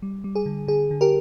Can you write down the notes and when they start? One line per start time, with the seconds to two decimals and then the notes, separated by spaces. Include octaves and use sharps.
0.02 G3
0.24 G3
0.35 G#4
0.46 D3
0.68 D3 G#4
0.91 D3
1.01 G4 A#4